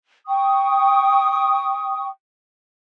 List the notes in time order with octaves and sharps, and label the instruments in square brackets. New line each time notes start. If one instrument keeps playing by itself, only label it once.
[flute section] G5 C#6 D#6